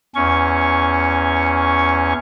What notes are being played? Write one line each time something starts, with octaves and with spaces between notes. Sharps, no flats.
E2 C#4 C#6